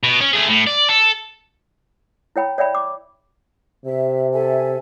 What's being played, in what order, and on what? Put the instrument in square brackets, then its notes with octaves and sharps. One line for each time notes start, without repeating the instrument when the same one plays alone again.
[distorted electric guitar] B2
C#4
A3 G#4
A2
D5
A4
[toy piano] E4 C#5 G5 B5
C#5 D5 E5 G5 B5
D6
[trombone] C3 [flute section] E5
[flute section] A4 E5 G#5